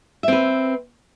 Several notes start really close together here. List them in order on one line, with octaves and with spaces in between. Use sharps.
E5 C4 B4